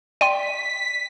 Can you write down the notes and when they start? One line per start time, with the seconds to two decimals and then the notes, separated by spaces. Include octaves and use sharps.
0.21 D5 G5 C6 B6 D#7